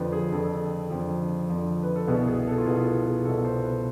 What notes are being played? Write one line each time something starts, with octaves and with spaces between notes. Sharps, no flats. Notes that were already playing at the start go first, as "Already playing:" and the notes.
Already playing: F2 D3 F3 B4
G#4
F2 D3 F3 A4
F2 D3 F3
F2 D3 F3
B4
A4
C2 B2 B3 G#4
G#4
A4
F4
C2 B2 B3 G#4
F4
G#4
C2 B2 B3 A4
C5
B4